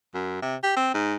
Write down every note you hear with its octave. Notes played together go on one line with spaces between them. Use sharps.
F#2
C3
G4
C4
G#2